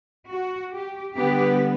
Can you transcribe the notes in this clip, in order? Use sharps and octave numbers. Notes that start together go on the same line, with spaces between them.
F#4
G4
D3 G3 B3 G4